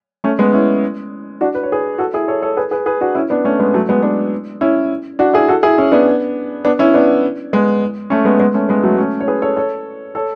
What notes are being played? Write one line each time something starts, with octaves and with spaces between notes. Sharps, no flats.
A3 C#4
G#3 B3
C#4 E4
D4 F#4
B4
C#5
G#4 B4
F#4 A4
E4 G#4
A4 C#5
A4 C#5
G#4 B4
G#4 B4
G#4 B4
D4 F#4
C#4 E4
B3 D4
A3 C#4
G#3 B3
F#3 A3
G#3 B3
B3 D4
C#4 E4
D4 F#4
E4 G#4
F#4 A4
E4 G#4
C#4 E4
B3 D4
B3 D4
C#4 E4
B3 D4
G#3 B3
A3 C#4
G#3 B3
G#3 B3
A3 C#4
G#3 B3
F#3 A3
A3 C#4
C#5
G#4 B4
A4 C#5
A4 C#5
A4 C#5